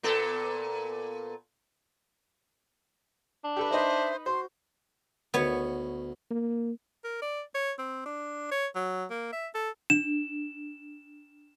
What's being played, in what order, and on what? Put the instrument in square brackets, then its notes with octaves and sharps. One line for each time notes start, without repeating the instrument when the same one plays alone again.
[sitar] A#2 B3 A4
[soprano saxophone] D4
[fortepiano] G4 A4 B4
[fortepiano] D#4 B4 D#5 [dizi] C5 [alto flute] E5
[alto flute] F#4 [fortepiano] C5 [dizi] C6
[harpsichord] D2 D#4 [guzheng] B3 C#5
[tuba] A#3
[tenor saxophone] A#4
D5
C#5
C4
D4
C#5
F#3
A#3
E5
A4
[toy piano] D4 [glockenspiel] E7